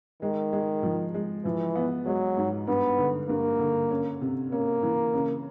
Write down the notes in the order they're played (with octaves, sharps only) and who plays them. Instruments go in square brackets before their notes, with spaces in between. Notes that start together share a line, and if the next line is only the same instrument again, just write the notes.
[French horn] D#3 [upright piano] G#3
[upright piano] G#3
F3
G#3
[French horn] E3 [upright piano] F3
[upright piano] B3
[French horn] F#3 [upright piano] G#3
[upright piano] G#2
[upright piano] G2 [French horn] B3
[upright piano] D3
[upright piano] G2 [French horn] A#3
[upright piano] D3
C#4
C3
[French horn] A#3 [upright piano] C#4
[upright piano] E3
C#3